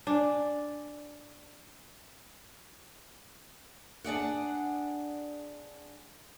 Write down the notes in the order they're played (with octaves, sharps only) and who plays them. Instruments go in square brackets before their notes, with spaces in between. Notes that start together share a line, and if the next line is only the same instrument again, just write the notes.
[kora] D4 [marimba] D5 G#5
[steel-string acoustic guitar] D4 G#4 D5 F#5